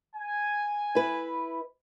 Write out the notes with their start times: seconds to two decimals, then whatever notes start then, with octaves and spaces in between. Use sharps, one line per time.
0.16 G#5
0.95 E4 B4